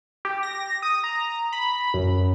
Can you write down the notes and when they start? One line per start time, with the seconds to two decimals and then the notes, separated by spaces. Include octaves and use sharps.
0.25 G4
0.43 A#6
0.82 D#6
1.04 A#5
1.53 B5
1.94 F#2